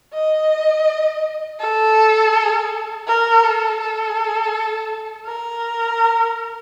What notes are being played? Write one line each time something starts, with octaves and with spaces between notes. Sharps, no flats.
D#5
A4
A#4
A4
A4
A#4